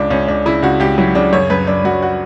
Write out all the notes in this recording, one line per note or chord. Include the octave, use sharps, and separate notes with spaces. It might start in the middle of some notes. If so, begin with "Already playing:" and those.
Already playing: C#2 D4
C#2 C#4
C#2 D4
C#3 E4
C#2 F#4
C#2 G4
F#3 E4
C#3 D4
F#2 C#5
F#2 B4
F#2 D4
F#2 F#4
F#4